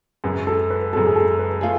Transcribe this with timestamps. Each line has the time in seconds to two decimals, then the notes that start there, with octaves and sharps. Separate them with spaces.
0.24 F#2 C#3 G#3 B4
0.47 A4
0.70 B4
0.93 F#2 C#3 G#3 A4
1.06 G#4
1.16 A4
1.39 B4
1.61 A3 F4 G#4